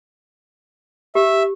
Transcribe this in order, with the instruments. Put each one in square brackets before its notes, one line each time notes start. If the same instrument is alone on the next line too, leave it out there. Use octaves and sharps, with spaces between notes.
[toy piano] G4 [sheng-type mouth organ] E5